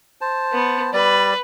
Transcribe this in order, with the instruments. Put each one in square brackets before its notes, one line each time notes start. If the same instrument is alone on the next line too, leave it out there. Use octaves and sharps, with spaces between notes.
[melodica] C5 A5
[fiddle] B3
[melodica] G3 D5 [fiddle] B4